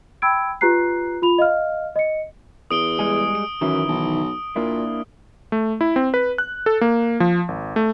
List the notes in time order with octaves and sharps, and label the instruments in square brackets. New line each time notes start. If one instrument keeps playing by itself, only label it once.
[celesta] G5 B5 E6 G#6 D7
F4 G4 B4 A#5 F#6 C7
F4 B5 F7
D#5 F5 F6
D#5 C#7
[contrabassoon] E2 [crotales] D#6 D7 G7
[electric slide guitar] G3 G#3 G#4
[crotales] D7
[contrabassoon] F#2 [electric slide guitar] D#3 E3 E4
[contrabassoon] B1
[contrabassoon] A#2 [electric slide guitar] A#3 D4 E4
[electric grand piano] A3
E4
C4
B4
F#6
A4
A#3
F3
G#1
A3